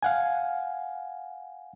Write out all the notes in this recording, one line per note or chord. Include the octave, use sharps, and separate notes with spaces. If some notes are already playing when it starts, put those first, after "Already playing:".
F5 F#5 G#5